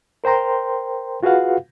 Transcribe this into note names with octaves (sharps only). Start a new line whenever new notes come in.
A#4 C5 G5 A#5 C6
F4 F#4 G#4 B4 F5 F#5